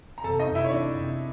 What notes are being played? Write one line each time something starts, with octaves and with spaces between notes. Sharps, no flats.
A#5
C3 A4 A5
D#4 D#5
C3
E4 E5
C#5
C3 D4 D5
C3